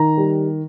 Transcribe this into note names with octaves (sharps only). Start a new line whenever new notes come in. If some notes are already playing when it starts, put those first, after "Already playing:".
Already playing: D#3 A#5
G3